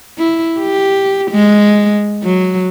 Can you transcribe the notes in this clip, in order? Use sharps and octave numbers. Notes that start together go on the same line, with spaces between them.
E4
G4
G#3
F#3